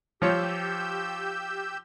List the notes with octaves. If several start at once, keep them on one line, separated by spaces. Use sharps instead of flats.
F3 G4 C#5 E6 G6